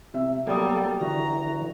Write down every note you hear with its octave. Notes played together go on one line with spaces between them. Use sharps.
C3 E5
B2 F#3 G3 A#3 A4 D#6
D3 E3 F#4 A#5